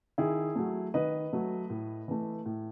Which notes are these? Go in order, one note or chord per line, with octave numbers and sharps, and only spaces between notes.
D#3 E4 G#4
F#3 A3
D#3 B4 D#5
F#3 A3
A2
E3 A3
A2